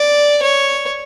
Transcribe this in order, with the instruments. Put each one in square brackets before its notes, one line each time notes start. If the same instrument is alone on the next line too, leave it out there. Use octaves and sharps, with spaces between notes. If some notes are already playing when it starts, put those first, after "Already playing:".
Already playing: [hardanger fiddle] D5
C#5